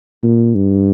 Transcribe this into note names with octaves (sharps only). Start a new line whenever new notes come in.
A#2
G2